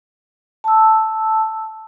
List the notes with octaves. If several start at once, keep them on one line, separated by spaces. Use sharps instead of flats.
A5 E6